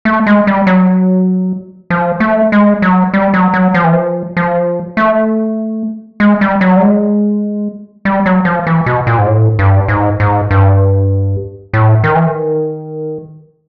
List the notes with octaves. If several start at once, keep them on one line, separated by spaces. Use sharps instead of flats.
A3
G#3
G3
F#3
F3
A3
G#3
F#3
G3
F#3
F#3
F3
E3
F3
F3
A3
G#3
G3
F#3
G3
G#3
G3
F#3
F3
E3
B2
A#2
G#2
A2
G2
G#2
G#2
G2
A2
D#3
E3
D#3